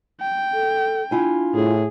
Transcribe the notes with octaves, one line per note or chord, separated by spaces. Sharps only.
G5
A4
D4 E4 F4 G#5
A2 G#4